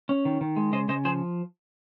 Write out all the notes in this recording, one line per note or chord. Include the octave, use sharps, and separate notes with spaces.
C#4
D#3
D#3
G#3
C#3 C5 D#5
C#3 C5 D#5
F3 G#4 C5